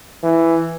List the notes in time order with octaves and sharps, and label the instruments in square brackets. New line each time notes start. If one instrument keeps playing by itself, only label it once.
[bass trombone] E3